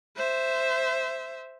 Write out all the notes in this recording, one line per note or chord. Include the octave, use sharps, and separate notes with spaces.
C5 E5